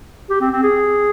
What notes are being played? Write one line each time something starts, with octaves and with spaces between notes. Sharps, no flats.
G4
C4
C4
G#4